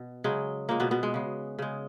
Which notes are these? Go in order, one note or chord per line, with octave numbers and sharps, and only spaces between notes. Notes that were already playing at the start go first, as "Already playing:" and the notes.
Already playing: B2
C#3 F#3 G#3
A#2 G#3 A#3
B2 B3
B2 B3
G#3
C#3 G#3
C#3 G#3